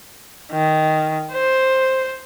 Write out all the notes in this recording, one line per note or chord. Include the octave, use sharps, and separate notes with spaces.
D#3
C5